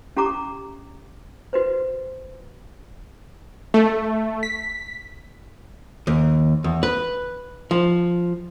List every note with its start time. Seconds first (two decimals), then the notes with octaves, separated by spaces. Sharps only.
0.17 C#4 G4 A4 A#5 D6
1.53 F#4 B4 C5
3.74 A3
4.43 B6
6.07 D#2
6.64 E2
6.83 B4
7.71 F3